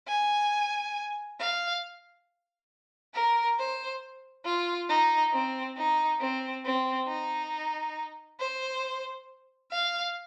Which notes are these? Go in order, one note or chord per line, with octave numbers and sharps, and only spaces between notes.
G#5
F5
A#4
C5
F4
D#4
C4
D#4
C4
C4
D#4
C5
F5